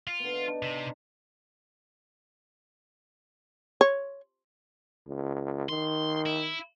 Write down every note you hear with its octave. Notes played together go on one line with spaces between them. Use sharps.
F4
D3 B3
D#5
D4 D#4
C3
A#5
C#5
C#2
D#3 C6
E4